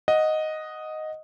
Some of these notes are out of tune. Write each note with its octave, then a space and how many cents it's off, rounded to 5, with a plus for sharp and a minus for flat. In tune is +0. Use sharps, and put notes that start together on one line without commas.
D#5 +0 F#5 -5